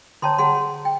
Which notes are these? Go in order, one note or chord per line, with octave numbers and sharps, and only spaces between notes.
D3 C#5 G5 A5 A#5 C6
G#4 F#5 A5 C6
G5